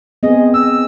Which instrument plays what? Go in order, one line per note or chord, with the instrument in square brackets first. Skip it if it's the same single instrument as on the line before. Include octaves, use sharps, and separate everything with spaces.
[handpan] B3 C4 G#4 [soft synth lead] D#5
[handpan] D#5 [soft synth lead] E6